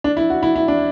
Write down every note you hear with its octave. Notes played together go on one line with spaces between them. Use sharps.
D4
E4
F#4
E4
E4
D4